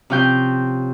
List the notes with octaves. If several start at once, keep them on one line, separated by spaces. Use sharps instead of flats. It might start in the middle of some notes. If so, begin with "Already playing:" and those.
C3 F3 C#4 F5 G5 G6